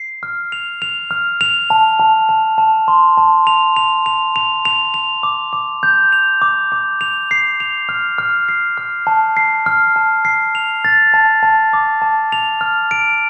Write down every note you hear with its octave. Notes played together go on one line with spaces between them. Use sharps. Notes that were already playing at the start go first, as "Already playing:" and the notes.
Already playing: C7
F6
F7
F7
F6
F7
A5
A5
A5
A5
C6
A5
F7
F7
F7
F7
F7
F7
D6
D6
G6
F7
D6
D6
F7
C7
F7
F6
F6
C7
F6
A5
C7
F6
A5
C7
F7
A6
A5
A5
D6
A5
F7
F6
D7